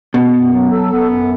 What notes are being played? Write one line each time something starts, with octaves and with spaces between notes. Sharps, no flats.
B2 B3
F#2
F#3
A4
B3
F#2